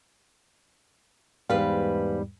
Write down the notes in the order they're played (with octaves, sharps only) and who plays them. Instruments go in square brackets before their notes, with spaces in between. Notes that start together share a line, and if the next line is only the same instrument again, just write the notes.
[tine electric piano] E2 G#2 G3 [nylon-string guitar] B4 F5